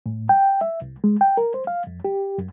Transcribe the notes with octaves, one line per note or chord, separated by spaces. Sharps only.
A2
G5
E5
C2
G#3
G5
A#4
C5
F5
F2
G4
F#2